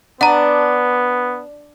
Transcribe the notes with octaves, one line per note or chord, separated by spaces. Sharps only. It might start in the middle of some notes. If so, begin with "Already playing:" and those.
B3 D4 F#5 A#5